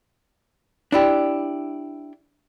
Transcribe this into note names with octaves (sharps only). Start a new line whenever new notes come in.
D4 E4 G4